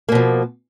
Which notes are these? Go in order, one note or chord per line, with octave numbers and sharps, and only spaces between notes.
B2 F3 A#3